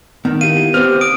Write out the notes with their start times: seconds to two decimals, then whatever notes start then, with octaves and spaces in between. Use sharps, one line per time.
0.25 D#3 B3
0.41 E4 G4 F5 D#7
0.74 B3 C4 G4 C5 F6
1.01 D#6 D7